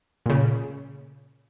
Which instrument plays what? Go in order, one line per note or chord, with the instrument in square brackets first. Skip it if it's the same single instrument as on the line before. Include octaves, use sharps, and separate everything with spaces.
[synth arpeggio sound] A#2 C#3